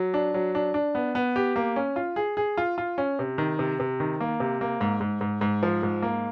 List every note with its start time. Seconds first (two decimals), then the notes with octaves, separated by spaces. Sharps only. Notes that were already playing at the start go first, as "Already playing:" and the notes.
Already playing: F#3
0.14 D4
0.34 F#3
0.55 D4
0.74 D4
0.95 B3
1.15 B3
1.36 G4
1.56 A#3
1.76 C#4
1.96 F4
2.16 G#4
2.37 G#4
2.57 F4
2.78 F4
2.98 C#4
3.19 C3
3.38 D#3
3.59 C3
3.80 C3
4.00 D#3
4.21 A#3
4.40 C3
4.61 A#3
4.81 G#2
5.01 G#2
5.21 G#2
5.41 G#2
5.63 F3
5.83 G#2
6.02 A#3